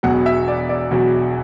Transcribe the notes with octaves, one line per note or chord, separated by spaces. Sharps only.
E1 E2 B2 F#3 F#5
E5
D5
D5
E1 E2 B2 F#3